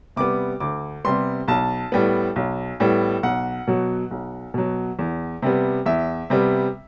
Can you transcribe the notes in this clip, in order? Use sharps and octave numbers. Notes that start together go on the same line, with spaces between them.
C3 G3 B3 D6
D2 D6
C3 G3 B3 C6
B1 A5
A2 G3 B3
B1
A2 G3 B3
B1 F#5
B2 F#3
B1
B2 F#3
E2
C3 G3 B3
E2 E5
C3 G3 B3